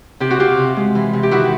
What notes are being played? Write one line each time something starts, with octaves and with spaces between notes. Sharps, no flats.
C3 G4
F#4
C3 F4 G4
C3
G#3
E3
C3
G4
D#3 E4 F#4